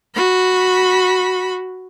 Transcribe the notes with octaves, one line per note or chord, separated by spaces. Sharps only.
F#4 B5